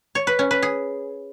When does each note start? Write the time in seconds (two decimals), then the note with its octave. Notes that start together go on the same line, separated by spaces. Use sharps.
0.15 C#5
0.27 B4
0.39 C#4
0.51 B4
0.63 G#4